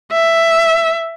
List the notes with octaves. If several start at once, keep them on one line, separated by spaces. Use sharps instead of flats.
E5